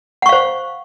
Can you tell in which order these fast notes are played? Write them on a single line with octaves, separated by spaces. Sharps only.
F#5 C#6 F5 C5